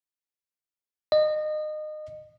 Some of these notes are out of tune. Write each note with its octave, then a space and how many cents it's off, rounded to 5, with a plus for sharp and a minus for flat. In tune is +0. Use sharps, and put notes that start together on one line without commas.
D#5 -25